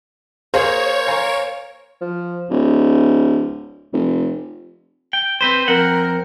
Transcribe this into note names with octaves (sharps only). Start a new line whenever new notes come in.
A#3 G#4 C5 C#5
F5 G#5 A#5
F3
D1
F1
G5
C4 B4 C5
F2 C4 A#4 F#5